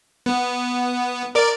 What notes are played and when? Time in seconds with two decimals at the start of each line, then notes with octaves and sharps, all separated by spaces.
0.26 B3
1.35 A#4 D5 D6